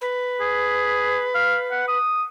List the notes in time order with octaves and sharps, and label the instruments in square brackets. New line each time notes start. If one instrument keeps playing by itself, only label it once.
[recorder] B4
[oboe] G#4
F5
F#5
D#6